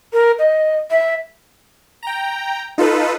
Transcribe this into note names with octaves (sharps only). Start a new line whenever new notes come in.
A#4
D#5
E5
G5 A#5
D#4 F4 A4 B4